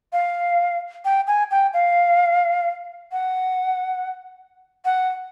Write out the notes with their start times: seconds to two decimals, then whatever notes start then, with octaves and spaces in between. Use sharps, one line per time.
0.13 F5
1.05 G5
1.27 G#5
1.51 G5
1.74 F5
3.12 F#5
4.85 F#5